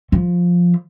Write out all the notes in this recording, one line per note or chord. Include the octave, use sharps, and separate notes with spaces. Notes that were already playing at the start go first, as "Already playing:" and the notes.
F3